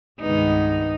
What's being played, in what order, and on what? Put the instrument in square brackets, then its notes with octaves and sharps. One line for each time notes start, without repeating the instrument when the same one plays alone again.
[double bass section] C2 D#3 B3 [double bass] G2 G#3 [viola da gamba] D#4